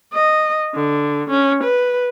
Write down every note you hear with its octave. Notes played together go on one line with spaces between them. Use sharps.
D#5
D3
C#4
B4